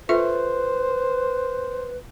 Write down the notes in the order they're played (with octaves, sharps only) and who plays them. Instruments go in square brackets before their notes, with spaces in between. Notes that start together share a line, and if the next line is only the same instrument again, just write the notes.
[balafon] F4 A4 E5 [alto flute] B4 [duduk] C5